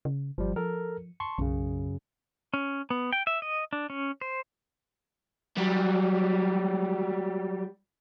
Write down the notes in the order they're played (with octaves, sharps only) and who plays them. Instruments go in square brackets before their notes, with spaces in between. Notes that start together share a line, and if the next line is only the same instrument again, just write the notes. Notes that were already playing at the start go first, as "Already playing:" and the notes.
[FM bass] C#3
[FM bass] G1 [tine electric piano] F3 G3
[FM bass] F3 [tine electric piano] A4 A#4
[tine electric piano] A5 C6 C#6
[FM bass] B1 [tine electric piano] F#2 C#3
[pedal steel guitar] C#4
B3
G5
E5
D#5
D4
C#4
C5
[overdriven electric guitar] F#3 G3